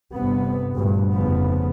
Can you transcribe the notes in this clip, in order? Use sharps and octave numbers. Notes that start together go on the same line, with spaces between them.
G1 G2 C3 B3
D2 G2 A#2
F1 C#3 F3 B3